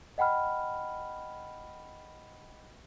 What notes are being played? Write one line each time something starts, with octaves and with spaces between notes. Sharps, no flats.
D#5 F#5 G5 B5 F6